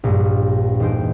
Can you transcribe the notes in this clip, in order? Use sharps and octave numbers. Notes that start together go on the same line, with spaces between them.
A#1 G2
E1 D#4 C5 G6 D7